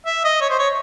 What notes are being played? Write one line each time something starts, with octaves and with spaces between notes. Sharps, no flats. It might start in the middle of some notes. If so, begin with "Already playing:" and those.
E5
D#5
C#5
C5
C#5